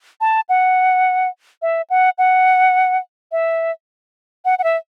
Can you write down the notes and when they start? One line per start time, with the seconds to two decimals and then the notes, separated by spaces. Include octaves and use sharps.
0.21 A5
0.49 F#5
1.62 E5
1.90 F#5
2.18 F#5
3.32 E5
4.45 F#5
4.59 F#5
4.64 E5